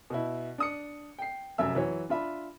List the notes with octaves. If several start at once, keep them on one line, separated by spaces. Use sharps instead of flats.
B2 E4
D4 D#6 C#7
G5 C7
F1 F#2 E5 E6
E3 F#3 C#5
D4 F4 E5 B5